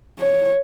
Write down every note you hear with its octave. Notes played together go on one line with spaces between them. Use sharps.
C#5